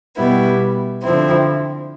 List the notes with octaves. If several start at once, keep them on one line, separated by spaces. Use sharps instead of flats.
B2 G3 B3 E4
D3 F3 C4 E4